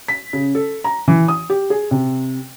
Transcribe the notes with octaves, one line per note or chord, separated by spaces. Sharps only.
B6
C#3
A4
A#5
E3
D#6
G4
G#4
C3